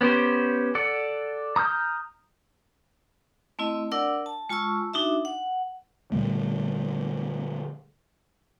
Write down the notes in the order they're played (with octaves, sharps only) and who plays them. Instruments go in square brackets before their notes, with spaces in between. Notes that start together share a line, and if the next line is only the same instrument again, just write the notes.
[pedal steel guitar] B3 C#4 G4 C5
A4 D5 F#5
A#5 D#6 F6 G6
[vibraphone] A3 C4 E4 D#5
D4 A#4 D5 F#5 E6
A5
G#3 F4 A5 C#6 E6
D4 D#4 F#4 E5
F#5
[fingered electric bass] A#2 D3 G3 A3